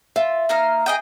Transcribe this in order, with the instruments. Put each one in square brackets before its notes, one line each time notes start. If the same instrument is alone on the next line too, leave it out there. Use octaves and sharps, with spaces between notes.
[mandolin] F4 [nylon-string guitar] E5
[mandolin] A#3 D#4 F5
G#4 D#5 G5